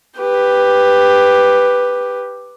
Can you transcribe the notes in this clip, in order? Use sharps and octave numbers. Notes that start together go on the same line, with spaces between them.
G4 B4